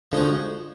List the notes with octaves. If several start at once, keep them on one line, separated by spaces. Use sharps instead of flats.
D3 F3 G#3 D#4 F#4